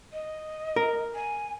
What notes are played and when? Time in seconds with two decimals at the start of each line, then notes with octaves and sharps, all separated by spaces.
0.13 D#5
0.76 A#4
1.15 G#5